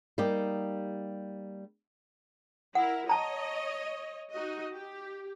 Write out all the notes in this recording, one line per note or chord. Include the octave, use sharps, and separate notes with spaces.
G3 A#3 D#4 G4
E4 A#4 F#5
C#5 D#5 A5 A#5
D#4 F#4 D#5
G4